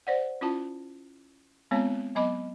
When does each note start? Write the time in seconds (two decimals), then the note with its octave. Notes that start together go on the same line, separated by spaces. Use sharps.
0.07 C5 D5 F#5
0.41 C#4 E4 F4 A5
1.71 G#3 B3 C4 F4 C#5 A5
2.15 F#3 B3 D#5 B5 D6